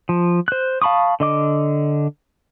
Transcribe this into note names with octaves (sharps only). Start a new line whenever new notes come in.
F3
C5 F#6
F5 A5 B5 C#6 D#6
D3 D#5 D6